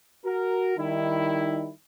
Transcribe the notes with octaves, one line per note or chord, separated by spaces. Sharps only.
F#4 A#4
D#3 G3 D#4 E4